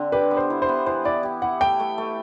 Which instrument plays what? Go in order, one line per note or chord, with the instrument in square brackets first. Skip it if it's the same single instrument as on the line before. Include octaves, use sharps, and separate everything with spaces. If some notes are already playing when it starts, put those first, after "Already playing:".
Already playing: [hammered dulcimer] D3 C4
[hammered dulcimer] G4 [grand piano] B4
[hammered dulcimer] B3
[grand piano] C5
[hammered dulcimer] E4
[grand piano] C5
[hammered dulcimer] B3
[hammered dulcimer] E3 [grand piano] C5
[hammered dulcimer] E4 [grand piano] D5
[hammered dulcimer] G4
[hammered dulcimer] E4 [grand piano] F#5
[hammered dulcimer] A3 [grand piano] G5
[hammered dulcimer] A3
A3